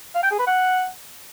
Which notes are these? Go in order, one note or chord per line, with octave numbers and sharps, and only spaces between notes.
F5
G5
G#4
B4
F#5